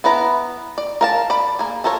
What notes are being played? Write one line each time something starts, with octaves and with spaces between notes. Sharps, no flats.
B3 E4 B4 A#5
D5
A#4 F5 A5
D5 B5
A#3 G#4
F3 A4 A#4 C#5